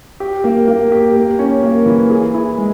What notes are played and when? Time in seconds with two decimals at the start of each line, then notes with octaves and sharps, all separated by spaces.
0.20 G4
0.44 A#3
0.68 A#3
0.92 G4
1.16 A#3
1.39 C#4
1.63 A#3
1.86 E3
2.10 G#4
2.34 E4
2.58 G#3